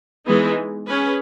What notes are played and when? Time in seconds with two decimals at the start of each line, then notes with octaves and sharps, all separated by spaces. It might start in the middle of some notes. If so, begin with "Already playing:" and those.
0.26 E3 G#3 B3 D#4
0.87 C#4 G#4 B4